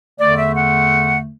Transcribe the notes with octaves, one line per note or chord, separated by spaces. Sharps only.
E2 D3 A3 D5
E5
F#5